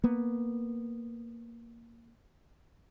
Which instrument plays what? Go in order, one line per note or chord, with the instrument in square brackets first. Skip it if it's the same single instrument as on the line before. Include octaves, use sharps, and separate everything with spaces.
[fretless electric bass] A#3 B3